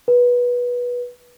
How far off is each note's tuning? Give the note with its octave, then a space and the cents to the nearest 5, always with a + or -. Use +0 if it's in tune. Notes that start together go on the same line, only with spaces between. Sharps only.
B4 -15